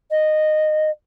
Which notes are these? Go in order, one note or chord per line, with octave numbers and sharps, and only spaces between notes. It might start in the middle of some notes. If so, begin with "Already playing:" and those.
D#5